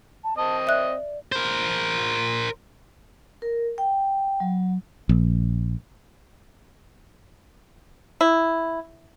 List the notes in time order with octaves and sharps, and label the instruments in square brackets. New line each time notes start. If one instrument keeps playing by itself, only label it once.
[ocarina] A5
[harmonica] C4 D#5 [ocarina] A5
[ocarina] D5 [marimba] E5 F#6
[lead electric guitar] A#4 C5
[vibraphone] A#4
G5
F#3
[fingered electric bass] A#1
[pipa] E4